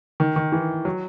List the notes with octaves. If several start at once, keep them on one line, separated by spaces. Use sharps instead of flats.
D#3
D#3
E3
F#3